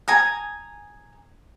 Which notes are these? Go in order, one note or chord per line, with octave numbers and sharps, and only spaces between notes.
G#5 A#5 D#6